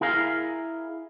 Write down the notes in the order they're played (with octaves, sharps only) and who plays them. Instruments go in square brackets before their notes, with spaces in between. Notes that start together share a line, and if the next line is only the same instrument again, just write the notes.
[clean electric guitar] E4 G#4 A#4 F5